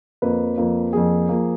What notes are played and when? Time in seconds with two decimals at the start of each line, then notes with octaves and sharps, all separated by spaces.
0.22 F2 F3 A#3 B4
0.57 F2 F3 A#3
0.93 F2 F3 A#3 G#4
1.29 F3 A#3